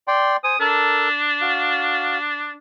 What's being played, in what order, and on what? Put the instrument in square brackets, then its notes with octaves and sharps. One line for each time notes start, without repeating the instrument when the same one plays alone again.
[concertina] D5 G5 C6
[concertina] C5 G#5 [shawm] D#6
[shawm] D4 [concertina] A4 A#4
[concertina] F#4 F5